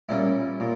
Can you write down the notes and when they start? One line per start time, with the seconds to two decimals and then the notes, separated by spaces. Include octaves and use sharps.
0.09 A#2 G3 C#4 E4
0.60 A#2